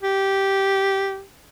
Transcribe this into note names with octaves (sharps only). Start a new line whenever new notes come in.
G4